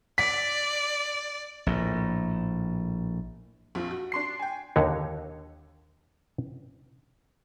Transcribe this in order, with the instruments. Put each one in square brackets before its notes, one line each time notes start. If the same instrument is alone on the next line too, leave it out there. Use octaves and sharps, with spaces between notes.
[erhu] D5 [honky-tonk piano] B6
[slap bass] A#1 A2
[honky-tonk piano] A#1 F2 F4
F#4
D4 C6 C7
G5 G#5
[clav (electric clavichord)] D#2 D3 D#4 C#5